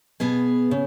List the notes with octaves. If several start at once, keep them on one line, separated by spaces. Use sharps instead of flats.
B2 B3 G#4
C#3